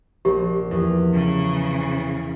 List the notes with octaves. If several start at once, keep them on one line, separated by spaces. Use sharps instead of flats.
A#1 G4
E2
C#3